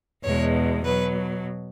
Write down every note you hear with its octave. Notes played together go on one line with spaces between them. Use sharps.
E2 B2 G#3 C#5
B2 F#3 B4